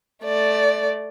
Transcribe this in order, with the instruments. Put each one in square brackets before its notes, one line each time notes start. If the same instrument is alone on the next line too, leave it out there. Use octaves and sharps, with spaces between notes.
[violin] A3 D5